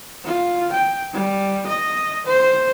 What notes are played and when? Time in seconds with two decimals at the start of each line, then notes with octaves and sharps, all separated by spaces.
0.25 F4
0.72 G5
1.13 G3
1.67 D#5
2.26 C5